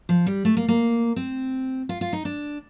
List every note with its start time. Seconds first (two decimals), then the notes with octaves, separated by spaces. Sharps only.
0.09 F3
0.27 G3
0.45 A3
0.57 A#3
0.68 A#3
1.16 C4
1.89 F4
2.01 F4
2.13 D#4
2.25 D4